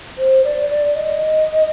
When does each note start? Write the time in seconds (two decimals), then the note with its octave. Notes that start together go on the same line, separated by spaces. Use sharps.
0.18 C5
0.44 D5
0.70 D5
0.95 D#5